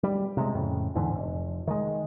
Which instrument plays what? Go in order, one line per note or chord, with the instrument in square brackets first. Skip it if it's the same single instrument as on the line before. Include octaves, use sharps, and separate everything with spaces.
[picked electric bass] G3
C3 G#3
F2 A2 C#3
E2 G#2 D3 E3
F1
D#3 G#3